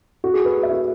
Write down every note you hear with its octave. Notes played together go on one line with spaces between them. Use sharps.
F#4
G#4
B4
E5
F#4